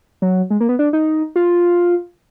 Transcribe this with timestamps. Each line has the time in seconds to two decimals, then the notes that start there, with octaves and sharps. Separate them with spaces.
0.22 F#3
0.50 G#3
0.61 A#3
0.69 B3
0.79 D4
0.93 D#4
1.36 F4